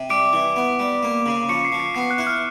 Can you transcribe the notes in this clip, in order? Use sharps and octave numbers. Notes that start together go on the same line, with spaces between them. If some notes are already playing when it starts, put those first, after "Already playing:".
Already playing: C3
G3 D6 D7
E3
B3
G3
A#3
C#3
F3 C#6 C#7
C7
F3
C7
B3 C7
F#6
E4
F6